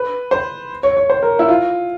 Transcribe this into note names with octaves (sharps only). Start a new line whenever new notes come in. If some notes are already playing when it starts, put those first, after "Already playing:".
Already playing: B4
C5
C#5
C#5
C5
A#4
E4
F4